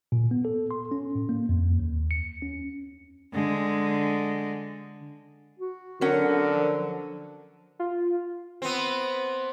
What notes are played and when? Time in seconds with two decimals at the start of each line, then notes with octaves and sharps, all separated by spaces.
0.12 A#2
0.31 B3
0.45 A4
0.71 C6
0.91 C#4
1.15 A2
1.29 A#3
1.49 F2
1.79 D#2
2.11 C#7
2.42 C#4
3.33 D3 G#3
5.59 F#4
6.01 D3 F#3 C#4 A#4 F#5
6.56 F3
7.79 F4
8.62 B3 C4